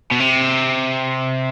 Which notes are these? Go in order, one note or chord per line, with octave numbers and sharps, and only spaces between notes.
B2
C3